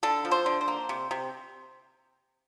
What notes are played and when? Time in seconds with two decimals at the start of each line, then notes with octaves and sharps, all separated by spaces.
0.03 D3 A4
0.25 F3
0.31 C5
0.46 D3
0.61 C5
0.68 A#3
0.89 C3
1.11 C3